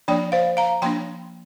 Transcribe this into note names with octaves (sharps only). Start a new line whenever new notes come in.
F3 A#3 D4 D5 G5
C5 F5
F5 A#5
F3 A#3 D4 G5 C6